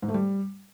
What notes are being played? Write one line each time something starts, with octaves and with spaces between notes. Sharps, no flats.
G#2
A3
G3